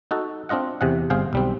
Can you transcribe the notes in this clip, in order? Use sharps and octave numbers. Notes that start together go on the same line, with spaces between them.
D#4 F#4 A4
C4 D4 F4 D#5 F#5
E2 C3 G#4 F#5
G1 C4 G#4 F5 G5
B1 G3 C4